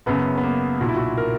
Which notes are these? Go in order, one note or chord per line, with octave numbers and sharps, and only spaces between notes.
F#1 F#2 C#3 B3
B3
A#3
B1 A#2 F#4
E4
F#4
A#4